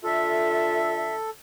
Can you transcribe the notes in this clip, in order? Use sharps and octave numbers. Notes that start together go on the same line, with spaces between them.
D3 F4 A4 E5